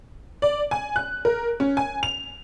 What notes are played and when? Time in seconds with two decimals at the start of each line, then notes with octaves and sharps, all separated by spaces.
0.42 D5
0.71 G#5
0.96 F#6
1.25 A#4
1.60 C#4
1.77 G#5
2.03 F7